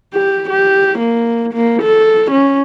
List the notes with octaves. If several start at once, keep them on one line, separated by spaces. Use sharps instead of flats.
G4
G4
A#3
A#3
A4
C#4